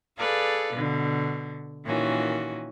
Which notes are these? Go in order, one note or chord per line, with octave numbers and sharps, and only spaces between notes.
G#4 A4 B4 D5 F5
B2 D3
A#2 D#3 E3 C#4 F#4